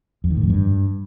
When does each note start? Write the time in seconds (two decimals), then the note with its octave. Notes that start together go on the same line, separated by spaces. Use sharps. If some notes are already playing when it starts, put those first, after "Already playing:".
0.24 F2
0.30 D#3
0.37 A2
0.43 F2
0.50 G2